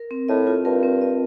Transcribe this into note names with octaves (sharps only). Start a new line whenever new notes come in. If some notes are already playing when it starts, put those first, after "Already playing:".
Already playing: A#4
C4
A2 D#5
F4
G2 A#4
C4
D#5